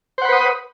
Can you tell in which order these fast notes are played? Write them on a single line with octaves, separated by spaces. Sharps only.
C5 F#5 B5 B4 D#6